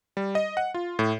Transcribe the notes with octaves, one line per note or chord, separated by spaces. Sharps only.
G3
D#5
F#5
F4
A2